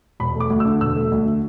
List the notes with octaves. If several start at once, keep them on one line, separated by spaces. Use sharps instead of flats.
E1 B5
A3
D6
D2
E6
D3
E1 E6
A3
D2
D3